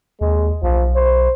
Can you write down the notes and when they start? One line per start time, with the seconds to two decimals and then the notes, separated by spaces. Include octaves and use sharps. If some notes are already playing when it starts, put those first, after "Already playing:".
0.21 D#2 G#3
0.63 B1 F3
0.96 C5